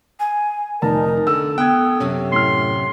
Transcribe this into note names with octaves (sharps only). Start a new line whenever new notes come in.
G#5
F1 D#4 A#4 D5 A5
D3 A4 E6
B3 G5 F#6 G#6
F#2 C3 C#4
A2 C6 F6